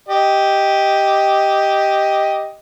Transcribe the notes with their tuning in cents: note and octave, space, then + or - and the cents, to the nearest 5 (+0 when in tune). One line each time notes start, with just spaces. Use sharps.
G4 +0 D#5 +10